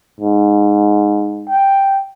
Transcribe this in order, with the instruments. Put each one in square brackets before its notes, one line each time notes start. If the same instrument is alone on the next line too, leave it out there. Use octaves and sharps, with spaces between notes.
[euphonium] G#2
[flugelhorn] G5